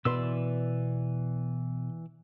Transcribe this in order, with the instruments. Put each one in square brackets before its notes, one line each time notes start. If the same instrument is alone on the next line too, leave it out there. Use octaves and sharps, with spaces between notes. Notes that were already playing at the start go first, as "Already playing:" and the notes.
[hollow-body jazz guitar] B2 B4 C6 [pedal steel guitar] E3 D5 E6